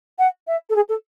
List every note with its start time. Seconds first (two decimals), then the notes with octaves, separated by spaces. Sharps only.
0.19 F#5
0.47 E5
0.69 A4
0.76 G#4
0.89 A4